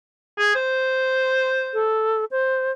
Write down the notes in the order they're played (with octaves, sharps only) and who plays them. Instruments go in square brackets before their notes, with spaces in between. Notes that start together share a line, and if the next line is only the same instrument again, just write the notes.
[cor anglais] G#4
C5
[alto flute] A4
C5